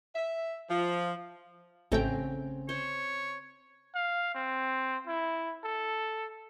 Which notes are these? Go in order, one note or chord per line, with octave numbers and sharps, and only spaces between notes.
E5
F3
A1 C#3 A3 C4 G5 A#5
C5 C#5
F5
C4
E4
A4